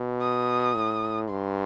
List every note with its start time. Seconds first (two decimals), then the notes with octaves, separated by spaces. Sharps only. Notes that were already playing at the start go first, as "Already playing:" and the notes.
Already playing: B2
0.21 D#6
0.76 A2
1.30 G2 C6